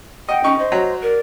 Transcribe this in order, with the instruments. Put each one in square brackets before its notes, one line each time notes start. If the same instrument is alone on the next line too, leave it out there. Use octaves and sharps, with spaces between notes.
[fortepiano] D#5 [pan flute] F#5 [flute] G5
[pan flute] C#4 [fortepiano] D#4 C#6
[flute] C5 [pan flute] D#5
[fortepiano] F#3
[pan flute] A#4 [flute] D5